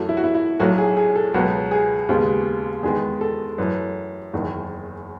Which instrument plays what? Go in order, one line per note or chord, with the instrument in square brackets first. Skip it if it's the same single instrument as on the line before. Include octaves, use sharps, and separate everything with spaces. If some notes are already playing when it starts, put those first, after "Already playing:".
Already playing: [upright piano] F#2 E3 A3 F#4
E4
F#4
E4
E4
B1 A2 F#3 A3 F#4
G#4
G#4
A4
C#2 B2 F#3 B3 F#4
G#4
D#2 C#3 G#3 B3
E2 D#3 G#3 B3 G#4
A4
F#2 E3 A3 B4
F#1 E2 D#3